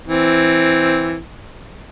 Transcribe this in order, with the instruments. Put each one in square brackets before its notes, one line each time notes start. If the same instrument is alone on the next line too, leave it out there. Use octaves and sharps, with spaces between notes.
[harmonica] E3 C4